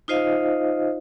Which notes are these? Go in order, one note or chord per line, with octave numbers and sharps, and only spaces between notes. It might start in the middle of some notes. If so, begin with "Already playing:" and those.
D#4 F4 C5 D#5 F5